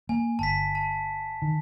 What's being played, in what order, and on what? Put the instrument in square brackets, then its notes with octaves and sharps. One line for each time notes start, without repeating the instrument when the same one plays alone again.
[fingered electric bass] A#3 [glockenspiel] G#5
[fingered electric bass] G1 [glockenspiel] A5 B6
[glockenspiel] A5
[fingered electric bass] D#3